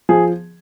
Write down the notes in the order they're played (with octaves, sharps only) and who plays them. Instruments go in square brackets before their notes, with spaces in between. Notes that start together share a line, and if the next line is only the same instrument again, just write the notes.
[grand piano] F3 G#4